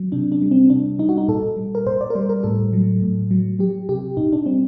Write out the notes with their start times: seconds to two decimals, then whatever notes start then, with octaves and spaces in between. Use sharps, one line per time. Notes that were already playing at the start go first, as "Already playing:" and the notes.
Already playing: F#3
0.12 C3 D4
0.32 D4
0.42 G3
0.51 C4
0.70 C3 D4
0.99 G3 D#4
1.09 F#4
1.17 D#4
1.28 A#2 A4
1.57 G3
1.75 A#4
1.86 A#2 C5
2.01 D5
2.10 A#4
2.15 G3 C5
2.29 A#4
2.43 A2 A4
2.73 F#3
3.02 A2
3.31 F#3
3.59 F#3 G4
3.89 C3 G4
4.17 A#2 D#4
4.33 D4
4.46 G3 C4